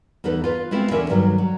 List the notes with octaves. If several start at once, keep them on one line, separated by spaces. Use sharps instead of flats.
E2 D#4 A4 B4
F4 B4
G#3 A3 B3 C4 E4 F4
E2 D3 C#4 A#4 D5 E5
G2 D#3 F#3 G3 A3 D4
F#3